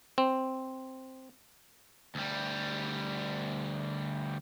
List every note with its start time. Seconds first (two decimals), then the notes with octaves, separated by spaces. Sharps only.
0.18 C4
2.15 D2 G3